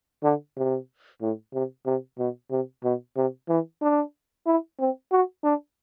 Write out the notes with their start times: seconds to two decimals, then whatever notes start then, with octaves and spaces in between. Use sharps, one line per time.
0.24 D3
0.57 C3
1.22 A2
1.54 C3
1.86 C3
2.18 B2
2.51 C3
2.84 B2
3.16 C3
3.49 E3
3.82 D4
4.47 E4
4.79 C4
5.12 F#4
5.44 D4